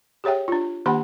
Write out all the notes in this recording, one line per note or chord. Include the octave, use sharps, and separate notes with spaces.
G4 G#4 C#5 E5 G5
D4 F4
D#3 A#3 D4 G4 F#5 B5